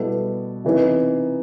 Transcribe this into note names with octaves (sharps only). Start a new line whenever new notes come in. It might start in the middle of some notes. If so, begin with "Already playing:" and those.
Already playing: B2 G3 B3 E4 A4
C3 E3 B3 D#4